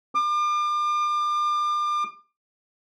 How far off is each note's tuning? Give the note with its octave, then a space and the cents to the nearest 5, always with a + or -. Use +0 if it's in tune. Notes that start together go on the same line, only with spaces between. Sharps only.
D6 +35